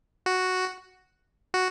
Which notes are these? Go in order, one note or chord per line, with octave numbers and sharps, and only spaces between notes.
F#4
F#4